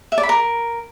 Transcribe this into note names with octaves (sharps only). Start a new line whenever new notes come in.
E5
D5
B5
A#4